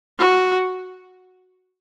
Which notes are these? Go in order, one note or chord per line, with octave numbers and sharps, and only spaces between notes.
F#4